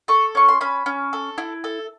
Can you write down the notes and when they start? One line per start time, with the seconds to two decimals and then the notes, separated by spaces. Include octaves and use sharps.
0.08 A4 C#6
0.35 C#4 C#6
0.48 C6
0.61 C#4 B5
0.86 C#4
1.13 A4
1.38 E4
1.64 A4